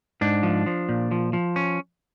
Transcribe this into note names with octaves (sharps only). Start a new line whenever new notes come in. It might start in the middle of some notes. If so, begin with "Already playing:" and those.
G#2 D4
F3
F3
A#2
F3
F3
C#4